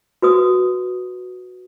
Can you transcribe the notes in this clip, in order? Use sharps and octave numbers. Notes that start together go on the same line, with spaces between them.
F#4 B4 D#6